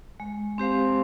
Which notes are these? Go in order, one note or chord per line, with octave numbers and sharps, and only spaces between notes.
G#3
C4 G4 C5 F5